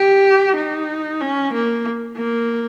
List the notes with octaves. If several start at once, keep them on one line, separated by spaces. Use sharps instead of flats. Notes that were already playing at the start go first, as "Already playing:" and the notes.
Already playing: G4
D#4
C#4
A#3
A#3